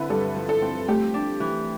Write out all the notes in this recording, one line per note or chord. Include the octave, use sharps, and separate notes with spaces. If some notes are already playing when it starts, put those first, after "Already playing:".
Already playing: D3 C4 E4 B4
G2 A4
F3
A4
C4
A3 G4
D4
E3